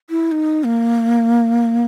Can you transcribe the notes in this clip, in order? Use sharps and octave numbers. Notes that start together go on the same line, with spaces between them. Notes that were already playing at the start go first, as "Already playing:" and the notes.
E4
D#4
A#3